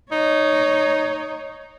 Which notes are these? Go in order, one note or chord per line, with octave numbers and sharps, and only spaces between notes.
D#4 C#5